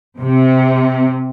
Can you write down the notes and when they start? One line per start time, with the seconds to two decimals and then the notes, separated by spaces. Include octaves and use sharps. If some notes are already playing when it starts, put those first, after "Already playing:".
0.19 C3